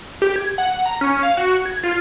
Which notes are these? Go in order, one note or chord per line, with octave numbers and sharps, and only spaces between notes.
G4
G#6
F#5
A#5
C#4
F5
F#4
G#6
F4